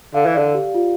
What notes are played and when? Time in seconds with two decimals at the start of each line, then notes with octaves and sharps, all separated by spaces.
0.14 D3 F5
0.26 E3
0.34 D3 D5
0.54 G4
0.74 F4